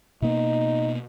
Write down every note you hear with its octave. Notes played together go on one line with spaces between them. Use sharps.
B2 A#3 B3 D#4